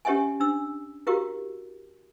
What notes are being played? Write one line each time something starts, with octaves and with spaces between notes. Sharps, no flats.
C#4 G4 C#5 E5 F#5 G#5
D4 E6
E4 F#4 G4 A#4 F5